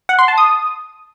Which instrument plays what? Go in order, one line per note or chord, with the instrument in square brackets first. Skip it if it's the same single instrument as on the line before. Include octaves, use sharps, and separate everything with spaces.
[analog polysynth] F#5
C6
A5
D#6